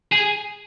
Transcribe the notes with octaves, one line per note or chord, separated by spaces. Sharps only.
G#4